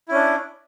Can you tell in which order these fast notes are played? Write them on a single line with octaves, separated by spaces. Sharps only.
E4 C#4 D4